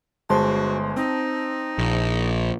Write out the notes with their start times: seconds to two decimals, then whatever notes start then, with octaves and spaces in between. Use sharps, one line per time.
0.30 G1 G#3 F#4 C5 A5 C6
0.96 C4 D#4
1.78 A#1